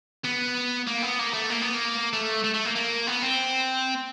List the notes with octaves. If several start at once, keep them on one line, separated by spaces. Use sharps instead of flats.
B3
A#3
B3
A#3
A3
A#3
B3
A#3
A3
A3
A3
A#3
A#3
B3
C4